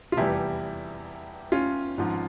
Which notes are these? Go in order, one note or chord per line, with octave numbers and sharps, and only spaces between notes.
F4
F1 E2 E3 G3 E4 G4
C#4 F4
G#1 G#2 F3